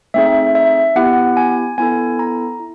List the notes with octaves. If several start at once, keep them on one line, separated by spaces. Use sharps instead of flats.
A3 C4 D#4 G#4 E5
E5
B3 E4 G4 F#5
G#5
B3 E4 A4 G#5
A#5
E4